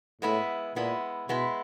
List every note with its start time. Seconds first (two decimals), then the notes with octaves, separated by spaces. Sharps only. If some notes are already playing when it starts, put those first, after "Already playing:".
0.22 A2 G#3 B3 E4
0.76 A#2 G#3 B3 E4
1.29 B2 G#3 B3 E4